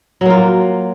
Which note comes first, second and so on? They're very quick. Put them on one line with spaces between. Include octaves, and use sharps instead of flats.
F#3 A#3 F4